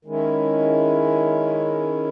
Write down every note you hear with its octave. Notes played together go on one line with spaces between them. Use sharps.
D#3 G#3 C#4 E4